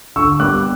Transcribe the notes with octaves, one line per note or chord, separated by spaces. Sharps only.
D3 C#6 E6
G3 B3 D6 F#6